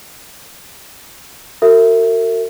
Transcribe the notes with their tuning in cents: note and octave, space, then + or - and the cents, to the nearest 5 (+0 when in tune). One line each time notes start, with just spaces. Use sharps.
F#4 +0 A#4 -45 E5 +0